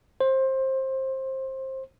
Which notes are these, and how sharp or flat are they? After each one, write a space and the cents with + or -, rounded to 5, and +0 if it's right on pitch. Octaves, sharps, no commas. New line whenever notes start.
C5 +20